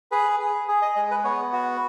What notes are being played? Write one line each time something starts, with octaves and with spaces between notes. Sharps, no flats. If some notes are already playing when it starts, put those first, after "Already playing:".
G#4 B4
G#4
G#4
D#5
G#3 D#5
B4
B3 C#5
F#4